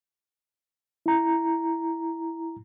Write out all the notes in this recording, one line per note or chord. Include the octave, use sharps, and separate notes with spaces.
E4 A#5